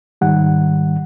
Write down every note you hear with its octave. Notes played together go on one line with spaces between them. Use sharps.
G#2 D#3 G3 F#5